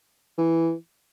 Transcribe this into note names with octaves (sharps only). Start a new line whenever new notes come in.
E3